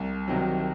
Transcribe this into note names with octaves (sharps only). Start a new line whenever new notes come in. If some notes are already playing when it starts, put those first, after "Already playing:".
Already playing: C2
C3 D#3 F#3